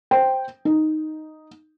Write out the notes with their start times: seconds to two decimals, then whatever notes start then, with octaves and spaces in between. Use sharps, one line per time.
0.11 C5 G5
0.65 D#4